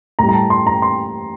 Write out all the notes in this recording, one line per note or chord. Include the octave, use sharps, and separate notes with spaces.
A2 G3 A#5
A#5
A5
C6
A#5
C6